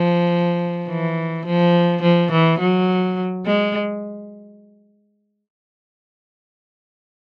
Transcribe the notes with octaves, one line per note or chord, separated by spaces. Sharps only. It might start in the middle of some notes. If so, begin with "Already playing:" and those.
Already playing: F3
E3
F3
F3
E3
F#3
G#3